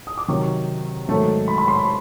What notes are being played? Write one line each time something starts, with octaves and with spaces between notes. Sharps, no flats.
D#6
D6
C3 D#3 F#3 C#6
G#2 D#3 F#3 A3
B5
B5
C6
B5